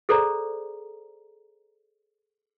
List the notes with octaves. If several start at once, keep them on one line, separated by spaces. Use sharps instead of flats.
G#4 A4 C5 D5 A#5